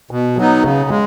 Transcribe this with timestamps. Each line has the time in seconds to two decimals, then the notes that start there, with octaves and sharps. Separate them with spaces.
0.11 B2
0.37 F#3 B3 D#4
0.64 C#3
0.90 G#3